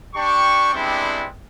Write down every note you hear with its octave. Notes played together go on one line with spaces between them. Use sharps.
D4 G4 G5 C#6
G3 G#3 B3 C4 D4 E4